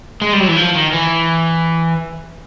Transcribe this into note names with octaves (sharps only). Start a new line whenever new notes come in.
G#3
G3
F#3
E3
F3
D#3
E3